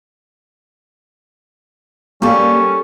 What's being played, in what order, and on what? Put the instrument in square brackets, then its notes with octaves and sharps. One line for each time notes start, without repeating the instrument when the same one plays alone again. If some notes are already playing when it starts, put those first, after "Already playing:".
[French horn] G3 [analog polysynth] A#3 [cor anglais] C#4 [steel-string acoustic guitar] G4 A4